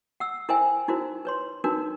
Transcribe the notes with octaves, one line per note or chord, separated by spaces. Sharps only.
F#5 E6
E4 A#4 C5 E5 G5 G#5
D#4 E4 F#4 A#4 C5
B4 C#5 C6
D4 D#4 F#4 A#4 B4